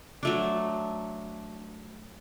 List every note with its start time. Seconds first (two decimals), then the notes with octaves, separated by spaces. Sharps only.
0.23 F#3 A3 D4